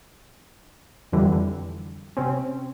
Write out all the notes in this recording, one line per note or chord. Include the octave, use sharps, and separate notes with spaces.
F2 D3 E3 G3
C3 C4 C#4